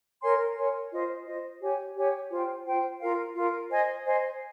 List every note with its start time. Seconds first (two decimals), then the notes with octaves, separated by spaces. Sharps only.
0.22 A#4 C#5 G#5 C6
0.56 A#4 C#5 G#5 C6
0.91 F4 C5 D#5
1.26 F4 C5 D#5
1.61 G4 C#5 G#5
1.95 G4 C#5 G#5
2.30 F4 C5 G5
2.66 F4 C5 G5
3.01 F4 A#4 F5
3.35 F4 A#4 F5
3.70 C5 D#5 G#5
4.05 C5 D#5 G#5